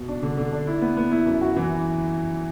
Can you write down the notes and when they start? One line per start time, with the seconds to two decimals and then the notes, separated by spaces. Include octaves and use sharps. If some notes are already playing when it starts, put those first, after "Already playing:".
Already playing: B2
0.08 D4
0.23 D3
0.37 D3
0.52 D4
0.67 E4
0.82 B3
0.97 B3
1.12 E4
1.26 F#2
1.41 F#4
1.56 E3